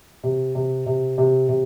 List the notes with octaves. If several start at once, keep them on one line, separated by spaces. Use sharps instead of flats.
C3
C3
C3
C3
C3